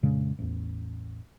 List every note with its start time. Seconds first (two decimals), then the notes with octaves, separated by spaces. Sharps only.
0.03 F2 A#2 C#3 G#3
0.39 A1 E2